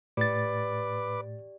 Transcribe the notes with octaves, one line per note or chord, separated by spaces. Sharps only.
A2 G4 B4 D5 D6 A6